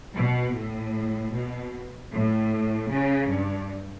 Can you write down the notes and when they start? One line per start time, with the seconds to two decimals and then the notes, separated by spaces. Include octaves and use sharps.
0.16 B2
0.54 A2
1.33 B2
2.12 A2
2.90 C#3
3.29 G2